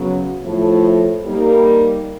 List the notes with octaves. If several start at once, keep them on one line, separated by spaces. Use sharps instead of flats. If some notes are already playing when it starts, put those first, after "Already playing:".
Already playing: C#3 F#3 B3
A2 F3 A3
G3 A#3 D#4